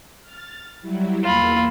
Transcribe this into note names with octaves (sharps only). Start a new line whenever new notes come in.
F6 A6
F#3 G3 E4
E2 A#3 F4 B5 E6